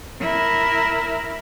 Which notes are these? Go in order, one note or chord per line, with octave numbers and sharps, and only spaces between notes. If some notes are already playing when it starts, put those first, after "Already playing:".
E4 A#4